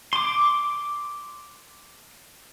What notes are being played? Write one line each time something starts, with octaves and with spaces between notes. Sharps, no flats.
C6 D6